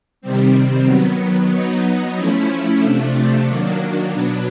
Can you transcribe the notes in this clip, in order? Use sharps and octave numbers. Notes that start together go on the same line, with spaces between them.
C3 D#3 G3 C4
D#3 F#3 B3
F#3 B3 D#4
F3 A3 C#4 E4
C3 F3 A3 D4
D#3 F#3 A#3 D4
B2 F#3 B3 D4